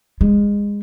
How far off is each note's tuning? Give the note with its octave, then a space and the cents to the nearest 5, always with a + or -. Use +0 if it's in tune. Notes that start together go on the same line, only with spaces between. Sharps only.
G#3 -25